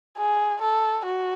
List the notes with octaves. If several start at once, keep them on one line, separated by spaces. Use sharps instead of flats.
G#4
A4
F#4